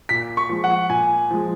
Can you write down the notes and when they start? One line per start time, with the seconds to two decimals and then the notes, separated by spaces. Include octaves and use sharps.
0.09 A#2 B6
0.37 C#6
0.49 F3 G#3
0.64 F#5
0.90 A#2 G#5
1.31 F3 G#3